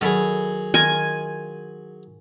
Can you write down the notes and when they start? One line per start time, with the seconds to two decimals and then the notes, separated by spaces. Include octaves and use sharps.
0.01 D#3 F#3 G#4 A4 B5
0.74 D#3 F4 G#5 A#5